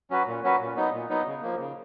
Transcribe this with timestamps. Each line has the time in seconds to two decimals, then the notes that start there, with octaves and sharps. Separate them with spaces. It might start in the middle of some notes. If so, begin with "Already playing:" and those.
0.10 F#3 C#4 F#4 B4
0.27 A#2
0.43 F#3 C#4 F#4 B4
0.60 A#2
0.76 F#3 B3 D#4
0.92 A#2
1.09 F#3 B3 D#4
1.27 C#3
1.42 F3 A#3
1.59 C#3